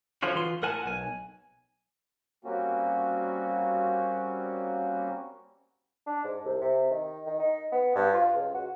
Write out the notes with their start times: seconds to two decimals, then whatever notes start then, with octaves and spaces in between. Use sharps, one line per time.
0.22 D3 F3 C#4 F4 F#4
0.35 E3 F4 C6
0.63 A2 A#4 F#5 G#5 A5
0.86 B1 G#5
2.44 G3 A#3 C4 C#4 F#4
6.07 D4
6.24 G#2
6.45 C2
6.61 C3
6.91 D#3
7.26 D#3
7.40 D#4
7.72 B3
7.96 G2
8.13 F4
8.34 C#2
8.54 F#4